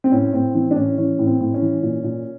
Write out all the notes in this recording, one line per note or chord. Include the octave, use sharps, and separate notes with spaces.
C4
A2 C#4
A2 C4
E3 C4
D4
A2 C#4
E3 C#4
A2
C4
A2
C#4
E3
A#2
A#2